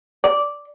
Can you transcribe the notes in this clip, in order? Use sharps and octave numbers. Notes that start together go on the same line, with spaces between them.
D5